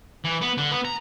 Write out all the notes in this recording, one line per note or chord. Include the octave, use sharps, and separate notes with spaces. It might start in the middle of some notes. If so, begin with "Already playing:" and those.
E3
B3
D3
B3
A#5